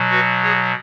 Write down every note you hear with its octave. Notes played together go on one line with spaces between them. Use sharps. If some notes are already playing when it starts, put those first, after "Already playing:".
Already playing: B2 F#3
F#4 B4
G#4 C#5